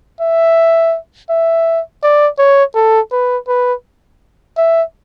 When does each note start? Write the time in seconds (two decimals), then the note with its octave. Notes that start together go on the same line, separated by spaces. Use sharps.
0.21 E5
1.30 E5
2.03 D5
2.38 C#5
2.75 A4
3.12 B4
3.48 B4
4.57 E5